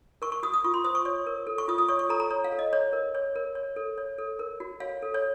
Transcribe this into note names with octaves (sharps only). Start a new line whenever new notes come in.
A#4 C#6
C#6
F#4 D#6
D#6
F4 C#6
C6
C5 D#6
C#6
C#5 C#6
A#4
A4
C#6
F4 D#6
D#6
C#5 C#6
C#6
A4 A#5
A#5
C#5
F5
A4
D#5
C#5
A#4
C#5
A#4
C#5
A4
C#5
A4
A#4
F#4
C#5 F5
A4
C#5